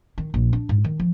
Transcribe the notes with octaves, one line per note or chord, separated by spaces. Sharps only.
D#3
A#1
D4
G#2
D#3
F3